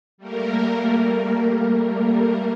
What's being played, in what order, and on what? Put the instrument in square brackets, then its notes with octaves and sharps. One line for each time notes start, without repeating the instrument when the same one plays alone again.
[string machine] G3 A3 A#3 A#4